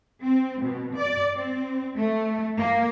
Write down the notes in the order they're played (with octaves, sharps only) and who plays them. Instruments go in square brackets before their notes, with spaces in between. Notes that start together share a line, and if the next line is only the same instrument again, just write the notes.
[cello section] C4
B2
D5
C4
A3
A#3